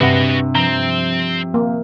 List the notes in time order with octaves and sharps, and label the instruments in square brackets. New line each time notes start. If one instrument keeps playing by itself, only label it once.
[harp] G2 [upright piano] C3 [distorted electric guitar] F#4 D#5 [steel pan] B4 F#5
[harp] F3 [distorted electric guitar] C4 [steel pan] A#5
[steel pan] A#3